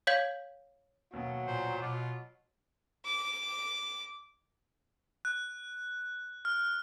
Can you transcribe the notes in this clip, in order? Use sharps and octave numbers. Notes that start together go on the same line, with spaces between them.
C#5 F5 G6 G#6 B6 F#7
D#2 B2 F#3
A#2 C5
B2 F4 D6
D6
F#6
F6